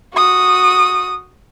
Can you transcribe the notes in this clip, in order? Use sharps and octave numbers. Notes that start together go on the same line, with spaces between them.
F#4 D#6